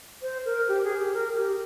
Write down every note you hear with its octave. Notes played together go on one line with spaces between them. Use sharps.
C5
A#4
G4
G#4
G4
A#4
G4